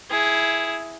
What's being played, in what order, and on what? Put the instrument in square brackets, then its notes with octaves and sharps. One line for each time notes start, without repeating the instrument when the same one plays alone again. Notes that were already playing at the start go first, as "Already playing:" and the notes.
[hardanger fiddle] E4 G#4